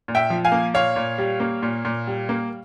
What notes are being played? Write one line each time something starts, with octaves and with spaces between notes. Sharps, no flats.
A#2
E5 G5
F3
F5 G#5
A#3
A#2 C#5 F5
A#2
G3
A#3
A#2
A#2
G3
A#3